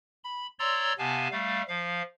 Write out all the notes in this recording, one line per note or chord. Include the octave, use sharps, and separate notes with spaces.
B5
C#5 D5 A#5 C6 E6
C3 B3 F5 G#5 A5
G3 A3 F5
F3 F5